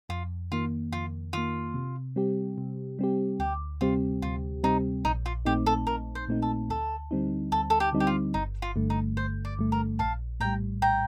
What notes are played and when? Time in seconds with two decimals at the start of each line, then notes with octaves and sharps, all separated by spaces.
0.09 F2 F4
0.52 D#3 A#3 F4
0.92 F2 F4
1.33 D#3 A#3 F4
1.74 C3
2.16 G3 C4 G4
2.58 C3
2.99 G3 C4 G4
3.39 D2 G4
3.81 C3 G3 C4 F4 G4
4.22 D2 F4
4.63 C3 G3 C4 D#4 G4
5.05 A#1 D#4
5.26 F4
5.45 A#2 A3 C4 D#4 G4
5.66 A4
5.87 A#1 A#4
6.15 C5
6.28 A#2 A3 C4 D#4
6.42 A4
6.69 D2 A4
7.11 D3 G3 C4 D#4
7.52 D2 A4
7.70 A4
7.80 G4
7.93 D3 G3 C4 D#4
8.00 G4
8.07 F4
8.34 G1 D#4
8.62 F4
8.76 G2 D3 A3
8.90 D#4
9.17 G1 C5
9.45 D5
9.59 G2 D3 A3
9.72 A#4
9.99 A#1 F5 A5
10.40 A2 G3 G5 A#5
10.82 A#1 G5 A#5